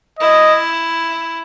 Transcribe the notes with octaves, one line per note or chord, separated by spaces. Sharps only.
E4 D#5